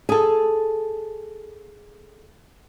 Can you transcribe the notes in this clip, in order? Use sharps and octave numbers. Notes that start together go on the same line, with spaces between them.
G#4 A4